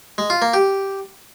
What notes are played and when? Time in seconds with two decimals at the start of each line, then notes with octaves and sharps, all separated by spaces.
0.18 G#3
0.30 F4
0.42 A#3
0.53 G4